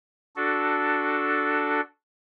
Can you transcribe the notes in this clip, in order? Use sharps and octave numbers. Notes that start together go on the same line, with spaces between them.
D4 F#4 A4